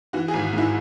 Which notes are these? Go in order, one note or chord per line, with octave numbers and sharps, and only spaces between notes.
E3 F#4
G#4
G#1
F#4
G#2 E4